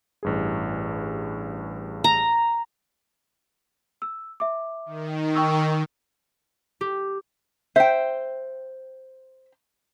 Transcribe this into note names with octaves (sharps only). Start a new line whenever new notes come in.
A1 G2 G#4
A#5
E6
E5 D6
D#3
G5 C#6 E6
G4
C5 E5 G5